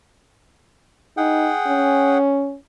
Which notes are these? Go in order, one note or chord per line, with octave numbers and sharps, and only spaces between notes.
D#4 G#4 F#5 G5
C#4